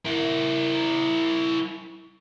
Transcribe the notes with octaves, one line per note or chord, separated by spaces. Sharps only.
E4 A#4